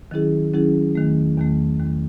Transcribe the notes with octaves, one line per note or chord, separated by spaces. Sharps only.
D#3 F#3 C#4 E4 G#4
D#3 F#3 C#4 E4 G#4
E2 D#3 A3
E2 D#3 A3
E2 D#3 A3